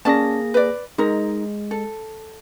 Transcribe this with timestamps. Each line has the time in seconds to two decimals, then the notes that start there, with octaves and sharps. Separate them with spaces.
0.05 A#3 C#4 G#4 D5 A5 A#6
0.54 B4 D5
0.98 G#3 D#4 A#4
1.71 A4